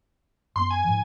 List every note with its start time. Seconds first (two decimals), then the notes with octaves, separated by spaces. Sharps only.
0.56 F#2 B3 C6
0.70 G#5
0.84 G#2 F3